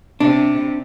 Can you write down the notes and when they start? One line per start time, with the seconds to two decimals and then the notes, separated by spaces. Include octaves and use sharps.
0.20 C3 D4